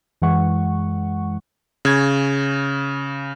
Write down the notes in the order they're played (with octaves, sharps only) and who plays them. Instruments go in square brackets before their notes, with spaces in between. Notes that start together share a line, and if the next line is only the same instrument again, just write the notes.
[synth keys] F#2 E3 G#3 F#5 C#6
[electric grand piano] C#3 G#6